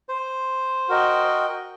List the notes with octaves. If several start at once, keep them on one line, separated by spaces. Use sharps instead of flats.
C5
F#4 A#4 D#5 G5